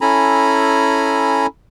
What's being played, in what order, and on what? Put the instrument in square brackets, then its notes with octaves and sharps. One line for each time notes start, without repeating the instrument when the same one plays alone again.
[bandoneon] C#4 E4 A4 G#5 A#5 B5